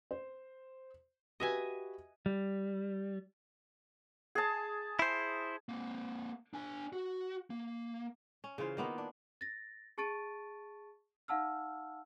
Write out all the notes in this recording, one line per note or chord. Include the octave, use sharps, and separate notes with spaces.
C5
F#4 G4 B4 D#5 E5 G#5
G3
G#4 A5
E4 C5
A#3 C4
D4 G#5
F#4
A#3
C#4
C#3 E3 F4 C5
D#3 A#3 B3 F4
D4
A6 A#6
G#4 A5 C#6 A6 D7 D#7
D#4 F5 F#5 A5 E6 F6